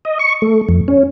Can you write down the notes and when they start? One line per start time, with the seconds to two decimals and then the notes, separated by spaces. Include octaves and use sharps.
0.05 D#5
0.19 C#6
0.42 A3
0.69 F2
0.88 C#4